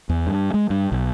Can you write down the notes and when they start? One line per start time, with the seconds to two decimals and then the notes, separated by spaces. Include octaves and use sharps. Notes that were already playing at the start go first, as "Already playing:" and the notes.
0.09 E2
0.27 G2
0.54 G#3
0.70 G2
0.92 B1